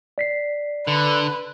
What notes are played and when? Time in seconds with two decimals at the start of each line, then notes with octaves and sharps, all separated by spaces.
0.18 D5 B6 C7
0.87 D3 B4